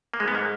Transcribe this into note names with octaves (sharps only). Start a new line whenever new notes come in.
A#3
G#2 G#3
B3
A#3